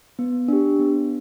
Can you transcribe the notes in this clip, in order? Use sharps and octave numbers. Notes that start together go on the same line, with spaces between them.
B3
D4 G4
B3